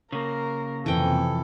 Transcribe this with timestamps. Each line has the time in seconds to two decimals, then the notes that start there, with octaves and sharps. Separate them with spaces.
0.12 C#3 A#3 A#4
0.86 F2 C3 E3 A4 G5